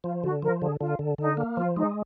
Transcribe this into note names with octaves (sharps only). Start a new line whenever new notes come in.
F3 F4
D3 F#4
F3 A#4
D3 G#4
D3 F4
D3
D3 D#4
A#3
F3 F4
G#3 D#4